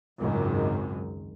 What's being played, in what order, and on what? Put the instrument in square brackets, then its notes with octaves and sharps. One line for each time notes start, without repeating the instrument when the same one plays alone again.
[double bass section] G#1 C#2 F#2 D#3